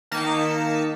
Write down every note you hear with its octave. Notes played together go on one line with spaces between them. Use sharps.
D#3 A#3 D#4 A5 B6 C#7